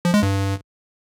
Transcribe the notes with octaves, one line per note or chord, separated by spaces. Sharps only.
F3
G#3
G2